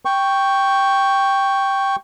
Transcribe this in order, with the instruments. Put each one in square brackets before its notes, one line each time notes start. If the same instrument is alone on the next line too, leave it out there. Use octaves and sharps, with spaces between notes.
[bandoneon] G5 C#6